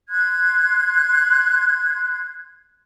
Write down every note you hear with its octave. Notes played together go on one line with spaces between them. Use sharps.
C6 F#6 G#6